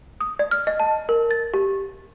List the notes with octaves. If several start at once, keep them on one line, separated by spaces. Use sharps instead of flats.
D#6
D5
F6
D#5
A5
A#4
A6
G4